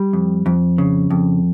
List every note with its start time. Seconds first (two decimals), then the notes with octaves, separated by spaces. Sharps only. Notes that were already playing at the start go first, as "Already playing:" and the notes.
Already playing: G3
0.13 F2
0.46 F2
0.78 C#3
1.11 F2